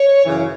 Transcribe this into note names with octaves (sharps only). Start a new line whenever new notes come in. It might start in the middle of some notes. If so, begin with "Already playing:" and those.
Already playing: C#5
F#2 C#3 E3